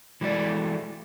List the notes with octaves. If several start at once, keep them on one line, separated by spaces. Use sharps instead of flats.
E3 G#3 A3 E4 D5